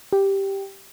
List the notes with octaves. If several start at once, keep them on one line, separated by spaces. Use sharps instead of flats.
G4